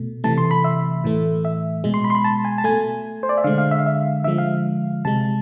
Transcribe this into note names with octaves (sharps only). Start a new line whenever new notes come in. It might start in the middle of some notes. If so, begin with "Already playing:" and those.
Already playing: B2 A3
C3 E3 A3 A5
C6
B5
E5
A2 E3 A3
E5
B2 G#3
C6
B5
C6
B5
A5
G#5
A5
B2 A3 G#5
C5
D5
E5
D3 G#3 F5
F5
E5
F5
E5
D3 F3 G#3 E5
F5
C3 G#3 A5